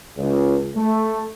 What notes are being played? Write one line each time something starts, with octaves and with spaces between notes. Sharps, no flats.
C#2
A3